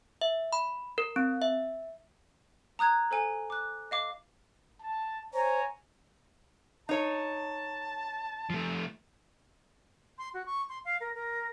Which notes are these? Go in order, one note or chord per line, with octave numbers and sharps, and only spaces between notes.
E5
B5
A#4
C4
E5
A#5 D#6 F#6 G#6
A4 C5 G#5
D6 F#6
D#5 F5 D6
A5
C5 C#5 G#5 A#5
D#4 C#5 A5
F3 A3
C6
F#4
C#6
C6
F5
A#4
A#4